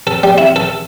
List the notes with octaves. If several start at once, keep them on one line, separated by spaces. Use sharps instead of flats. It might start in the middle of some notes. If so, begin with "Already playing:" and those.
A4
G3
E4
A4